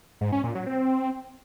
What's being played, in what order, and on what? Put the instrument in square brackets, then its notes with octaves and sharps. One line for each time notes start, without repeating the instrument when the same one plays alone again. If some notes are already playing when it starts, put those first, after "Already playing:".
[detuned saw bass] G#2
C#4
A#2
F#3
C4